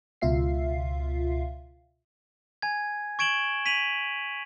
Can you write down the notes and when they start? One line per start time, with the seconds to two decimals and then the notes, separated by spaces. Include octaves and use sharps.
0.21 C#2 B2 F4 E5 F5 C7
2.62 G#5 G#6
3.19 C#6 G#6 D7 E7 F#7 G7
3.66 B6 D#7 F7 F#7